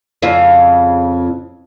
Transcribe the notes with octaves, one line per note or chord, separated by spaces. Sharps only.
F2 C#3 F4